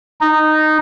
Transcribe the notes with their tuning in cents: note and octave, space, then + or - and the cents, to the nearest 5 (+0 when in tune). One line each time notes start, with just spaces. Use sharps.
D#4 -10